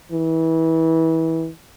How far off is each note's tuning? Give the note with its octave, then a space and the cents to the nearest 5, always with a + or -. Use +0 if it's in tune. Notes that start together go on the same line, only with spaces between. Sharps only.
E3 -25